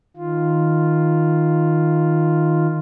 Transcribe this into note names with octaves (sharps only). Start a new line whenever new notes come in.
D#3 F4